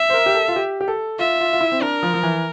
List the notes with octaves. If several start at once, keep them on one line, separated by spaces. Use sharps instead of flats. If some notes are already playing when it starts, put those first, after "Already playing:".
Already playing: E5
C5
A#4
G4
A4
F4
G4
G4
A4
F4 E5
F4
F4
E4
C4
D4 A#4
F3
F3
E3